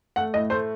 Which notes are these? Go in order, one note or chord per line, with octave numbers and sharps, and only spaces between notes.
A3 F#5
A2 D#5
A3 C5